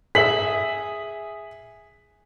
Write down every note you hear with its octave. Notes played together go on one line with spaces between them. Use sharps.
G#4 E5 B6 F#7